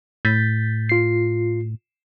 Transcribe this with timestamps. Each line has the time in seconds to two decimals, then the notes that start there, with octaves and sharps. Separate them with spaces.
0.25 A2 G6 A6 B6
0.89 F4 C7